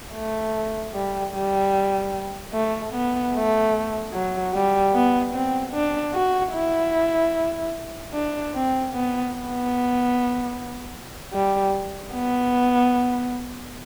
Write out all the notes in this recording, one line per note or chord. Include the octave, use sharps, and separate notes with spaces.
A3
G3
G3
A3
B3
A3
F#3
G3
B3
C4
D4
F#4
E4
D4
C4
B3
B3
G3
B3